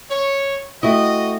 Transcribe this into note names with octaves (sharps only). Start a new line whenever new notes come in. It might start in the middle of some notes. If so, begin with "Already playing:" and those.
C#5
A3 C4 E4 F#4 D#5